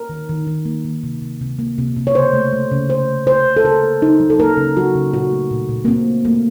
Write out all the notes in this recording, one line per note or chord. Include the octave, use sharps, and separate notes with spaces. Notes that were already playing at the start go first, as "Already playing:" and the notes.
Already playing: A#4
D#3
D#3
D#3
A#3
D#3
C3
C3
C3
A#3
C3
C3
C#5
C#3 C5
A3
A3
C#3
C#3 C5
A3
C#3 C5
C#3
A4
C#3 A#4
A#3
C#3 D#4
F#3
A4
A#3 A#4
C#3
F#3 F#4
C#3
A#2 F#4
A3
A#2
A#2
A#3
A#2 C4
A3
A3 A#3